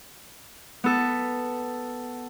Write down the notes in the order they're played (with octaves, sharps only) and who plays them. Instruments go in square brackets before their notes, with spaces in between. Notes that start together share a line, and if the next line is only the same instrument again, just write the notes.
[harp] B3 A4